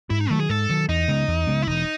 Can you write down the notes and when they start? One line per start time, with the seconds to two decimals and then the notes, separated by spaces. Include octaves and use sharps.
0.10 G#2 E4
0.20 D#4
0.30 D#3 F#3 A3
0.40 G#4
0.49 G#2 A4
0.69 D#3 F#3
0.89 E2 D#4
1.08 C#3 G#3 B3
1.28 E2
1.47 C#3 G#3 B3
1.62 E4
1.67 E1 D#4